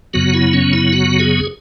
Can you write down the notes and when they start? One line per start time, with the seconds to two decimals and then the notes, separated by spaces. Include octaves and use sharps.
0.14 F#2 C#3 F#3 B3 F#4
0.33 E4
0.53 C#4
0.73 E4
0.93 F#4
1.19 G#4